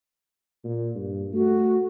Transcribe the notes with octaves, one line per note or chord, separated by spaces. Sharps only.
A#2
G2
A3 F#4